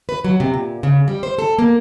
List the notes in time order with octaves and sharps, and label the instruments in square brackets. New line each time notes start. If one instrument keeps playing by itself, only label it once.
[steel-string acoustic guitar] B4
F#3
C3
A#2
C#3
G3
C5
A4
A#3